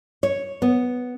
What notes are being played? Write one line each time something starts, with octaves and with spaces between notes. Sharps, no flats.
C#5
B3